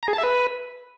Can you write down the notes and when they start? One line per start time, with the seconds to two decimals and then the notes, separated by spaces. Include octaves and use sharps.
0.03 A#5
0.08 G#4
0.13 A5
0.18 E5
0.23 B4